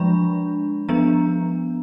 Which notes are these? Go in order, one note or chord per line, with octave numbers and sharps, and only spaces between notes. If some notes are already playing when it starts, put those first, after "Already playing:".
Already playing: F3 G#3 D4 B5
F3 B3 D4 A#5